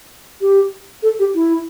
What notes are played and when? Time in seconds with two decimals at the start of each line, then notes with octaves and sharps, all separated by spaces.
0.41 G4
1.03 A4
1.19 G4
1.34 E4